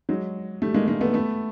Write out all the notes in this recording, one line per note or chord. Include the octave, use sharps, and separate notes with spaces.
F#3 G#3
G3 A3
G#3 A#3
G#3 A#3
A3 B3
A3 B3